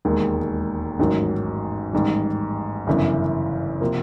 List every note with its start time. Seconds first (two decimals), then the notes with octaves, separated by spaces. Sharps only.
0.05 E1 D#2 D#3 G#3
0.99 A1 G#2 D#3 F#3
1.93 A1 G#2 D#3 G3
2.87 G1 F#2 C#3 E3
3.81 C3 F3 A#3